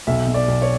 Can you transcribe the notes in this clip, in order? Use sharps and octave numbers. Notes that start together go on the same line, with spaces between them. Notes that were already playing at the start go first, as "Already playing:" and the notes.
B1 E5
B2
D5
B1
C#5